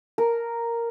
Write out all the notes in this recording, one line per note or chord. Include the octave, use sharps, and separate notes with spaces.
A#4